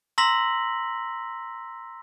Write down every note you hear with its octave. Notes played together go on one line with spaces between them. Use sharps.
A#5 C6 E6 A#6 B6 F#7